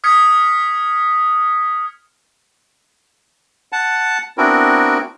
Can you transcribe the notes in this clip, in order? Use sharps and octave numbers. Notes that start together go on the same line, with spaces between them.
D#6 F6 G#6 B6 C#7
F#5 A5
B3 C4 D4 E4 F#4 A#4